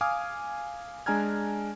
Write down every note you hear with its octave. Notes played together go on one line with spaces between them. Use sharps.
F5 G#5 D6 D#6 F6
G#3 D4 G#5 A#5 F6 G#6